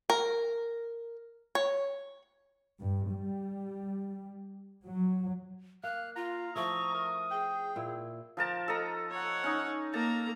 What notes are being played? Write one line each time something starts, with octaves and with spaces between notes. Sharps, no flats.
A#4
C#5
G2
G3
F#3
A#3 F5 F#6
F4 F5 A#5
F3 A3 E4 C#6 D#6
A#4
G#4 G5
A#2 E4
F3 A#4 A5
A4 D#5 A#5
C#5 F#5
C#4 D#4
A#3 A5 A#5